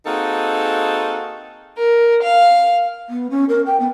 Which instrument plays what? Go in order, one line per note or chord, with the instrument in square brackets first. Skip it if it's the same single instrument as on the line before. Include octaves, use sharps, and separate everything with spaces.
[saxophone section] A#3 C4 D#4 F#4 G#4 A4
[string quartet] A#4
F5
[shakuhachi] B3
C#4
A#4
G5
B3